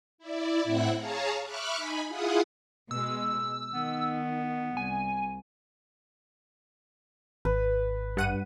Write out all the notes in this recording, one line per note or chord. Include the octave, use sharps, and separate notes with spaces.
E4 D5
A2 C4 E4 E5 F#5 F#6
G#4 C#5 F5 A5 A#5
E5 B5 C#6 D6 F6 F#6
D#4 G#5 B5
E4 F4 G#4 F5 F#5 D#6
B2 G#3 E6
D#3 B3
C2 G#5
G#1 B4
G2 F#5 D#7